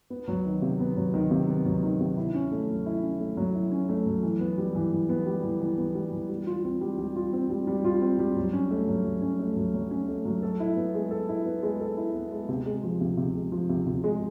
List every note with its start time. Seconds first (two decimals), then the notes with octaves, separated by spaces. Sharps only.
0.10 B3
0.28 F#3
0.45 D#3
0.62 C3
0.80 B3
0.96 F#3
1.14 D#3
1.31 C3
1.48 B3
1.66 F#3
1.83 D#3
2.00 C3
2.17 E4
2.34 C#4
2.51 A3
2.68 F#3
2.86 E4
3.03 C#4
3.20 A3
3.37 F#3
3.55 E4
3.72 C#4
3.89 A3
4.06 F#3
4.23 E3
4.40 B3
4.58 G3
4.75 E3
4.92 E3
5.09 B3
5.27 G3
5.44 E3
5.60 E3
5.78 B3
5.95 G3
6.12 E3
6.29 G3
6.47 F4
6.64 C4
6.81 G3
6.98 G3
7.16 F4
7.33 C4
7.50 G3
7.67 G3
7.85 F4
8.01 C4
8.19 G3
8.36 F#3
8.53 C#4
8.71 A3
8.88 F#3
9.05 F#3
9.22 C#4
9.39 A3
9.57 F#3
9.74 F#3
9.91 C#4
10.08 A3
10.25 F#3
10.43 A4
10.60 E4
10.77 B3
10.94 G#3
11.11 A4
11.29 E4
11.46 B3
11.63 G#3
11.80 A4
11.97 E4
12.15 B3
12.32 G#3
12.49 C3
12.66 G#3
12.83 F3
13.01 C3
13.17 C3
13.35 G#3
13.52 F3
13.69 C3
13.87 C3
14.04 G#3